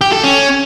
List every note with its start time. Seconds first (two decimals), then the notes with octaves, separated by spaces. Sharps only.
0.01 G4
0.12 A4
0.23 C#4